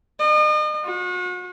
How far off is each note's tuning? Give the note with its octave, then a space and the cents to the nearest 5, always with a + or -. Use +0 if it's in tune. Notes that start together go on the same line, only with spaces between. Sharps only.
D#5 -40
F#4 -40